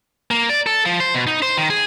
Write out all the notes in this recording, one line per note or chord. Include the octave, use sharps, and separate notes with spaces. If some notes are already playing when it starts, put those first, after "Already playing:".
A#3
D5
A4
F3
C5
B2
D#4
C5
D#3
G#4